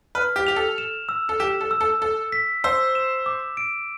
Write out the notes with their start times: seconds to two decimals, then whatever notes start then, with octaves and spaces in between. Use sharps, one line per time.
0.15 B4 F6
0.36 G4
0.47 G4 F7
0.56 A4
0.78 E7
1.09 E6
1.29 A4
1.40 G4 E7
1.61 A4
1.71 E6
1.81 A4
2.02 A4 E6
2.32 B6
2.64 C5 E6
2.95 E7
3.26 D6
3.57 D7